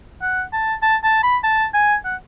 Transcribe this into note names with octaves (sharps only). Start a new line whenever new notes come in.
F#5
A5
A5
A5
B5
A5
G#5
F#5